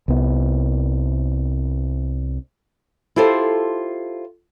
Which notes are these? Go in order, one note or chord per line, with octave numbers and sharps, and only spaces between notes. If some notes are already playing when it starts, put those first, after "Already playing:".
C2 B3
E4 F4 G4 A4 C5